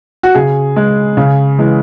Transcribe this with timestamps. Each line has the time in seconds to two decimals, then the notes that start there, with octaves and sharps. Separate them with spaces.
0.23 F#4
0.35 C#3 G#4
0.76 G#3
1.17 C#3
1.58 E3 G#3